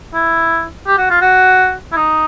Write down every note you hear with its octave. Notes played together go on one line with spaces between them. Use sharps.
E4
G4
F#4
F4
F#4
E4
D#4